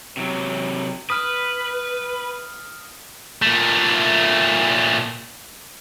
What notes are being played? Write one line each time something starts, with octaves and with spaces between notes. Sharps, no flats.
C3 F#3
B4 D#6 F6
A#2 A3